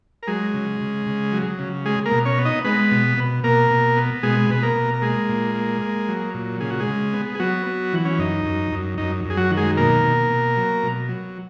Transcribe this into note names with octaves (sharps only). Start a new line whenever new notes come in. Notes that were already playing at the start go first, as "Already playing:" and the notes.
A#4
F#3 G#3 G#4
C#3
C#3
C#3
F#3
C#3
G#3 G#4
A#3 A#4
B2
C#4 C#5
B3
D#4 D#5
G#3 B3 B4
B2
B2
B2 A#3 A#4
B2
B3
B2 G#3 G#4
B2 B4
A#3 A#4
B2
A#4
G#3 A#3 G#4
A#2
A#3
A#3
F#3
A#2
C#3 G#4
F#4
G#3 G#4
C#3
B3
G#4
F#3 B3 F#4
B3
E3
C#4
F#2 D#4
F#2
F#2
F#2 D#4
F#2
G#4
F#3 F#4
D#3
G#3 G#4
B2 A#3 A#4
B2
B2
F#3
B2
F#3